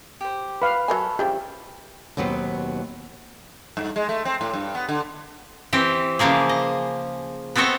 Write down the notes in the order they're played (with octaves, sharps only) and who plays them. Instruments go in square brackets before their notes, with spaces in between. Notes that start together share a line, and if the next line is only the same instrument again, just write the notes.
[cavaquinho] G4 C5
[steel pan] B4 F5 [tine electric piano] B5
[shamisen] F#3 A#4 G#5 [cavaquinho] A4 C#5
[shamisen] C#3 E3 F3 [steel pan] G4
[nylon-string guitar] D#2 B2 F#3 B3 C4
[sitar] G2
G#3
A3
C4
A2
G2
B3
D3
[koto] E3 C4 G4
C#3 E3 F3 A#3 G#4
D#5
B3 C4 A4 C#5 D#5